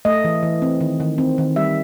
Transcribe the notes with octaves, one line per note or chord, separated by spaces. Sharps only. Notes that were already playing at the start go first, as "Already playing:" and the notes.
A3 D#5
E3
E3
C4
D#3
D#3
C4
D#3
G3 E5